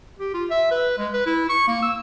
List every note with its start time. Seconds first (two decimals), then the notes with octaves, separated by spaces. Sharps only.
0.19 G4
0.34 F4
0.50 E5
0.71 B4
0.98 G#3
1.13 B4
1.26 E4
1.49 C#6
1.68 A#3
1.82 E6